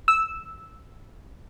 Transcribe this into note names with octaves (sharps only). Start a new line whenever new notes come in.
E6